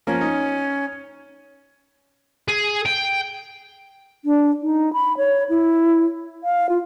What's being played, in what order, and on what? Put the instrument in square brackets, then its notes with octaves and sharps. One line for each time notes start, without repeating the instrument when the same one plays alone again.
[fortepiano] F3 A#3 [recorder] C#4
[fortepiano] D#4
[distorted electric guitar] G#4
G5
[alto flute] D4
D#4
B5
C#5
E4
F5
F4